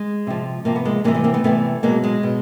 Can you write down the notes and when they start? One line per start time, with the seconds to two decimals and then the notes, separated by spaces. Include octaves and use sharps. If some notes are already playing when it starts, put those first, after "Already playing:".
Already playing: G#3
0.27 C3 F3
0.65 C3 F3 A#3
0.76 B3
0.85 G#3 A#3
1.04 C3 E3 G3 G#3 A#3
1.14 A3 B3
1.24 A#3 C4
1.34 A3 B3
1.44 C3 E3 G3 A3 B3
1.83 B2 F#3 G#3 A#3
2.04 G#3
2.23 B2